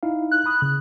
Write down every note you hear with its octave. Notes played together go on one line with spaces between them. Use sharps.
D#4 E4 F5
F#6
B5 D#6
C#3